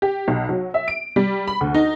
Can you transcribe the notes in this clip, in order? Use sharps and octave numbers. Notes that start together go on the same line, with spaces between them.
G4
B1
F#3
E5
D7
G3
B5
D2
D#4